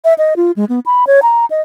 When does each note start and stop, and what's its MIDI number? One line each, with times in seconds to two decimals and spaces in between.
0.05 0.14 76
0.18 0.34 75
0.36 0.52 65
0.56 0.65 56
0.69 0.80 59
0.86 1.04 83
1.07 1.20 73
1.23 1.45 82
1.50 1.61 75